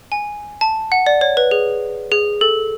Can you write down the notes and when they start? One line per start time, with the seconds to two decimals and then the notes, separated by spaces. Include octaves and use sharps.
0.12 G#5
0.61 A5
0.92 F#5
1.06 D5
1.21 C#5
1.37 B4
1.51 G#4
2.12 G#4
2.41 A4